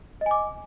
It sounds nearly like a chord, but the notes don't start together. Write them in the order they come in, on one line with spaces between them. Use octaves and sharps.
D#5 G#5 D6